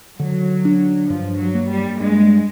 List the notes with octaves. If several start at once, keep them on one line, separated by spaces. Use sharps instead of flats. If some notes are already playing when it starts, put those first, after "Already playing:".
D3 F#3
D4
G2 F3
F#3
A#3
G3
G2 G#3